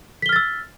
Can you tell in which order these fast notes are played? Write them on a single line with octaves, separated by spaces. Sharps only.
B6 G7 F6 A6 E6